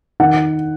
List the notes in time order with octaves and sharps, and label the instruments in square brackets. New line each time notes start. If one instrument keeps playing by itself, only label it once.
[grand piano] D#3 F#5